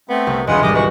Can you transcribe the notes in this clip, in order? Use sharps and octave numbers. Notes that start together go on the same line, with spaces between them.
A3 B3 C4
C2
E1 C2 C#3 G#3 F4 G#4 B4 F#5
G#1 G3 D5 D#5 D6
E3 F#4 B4 C#6